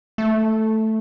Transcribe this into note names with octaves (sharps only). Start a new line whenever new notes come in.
A3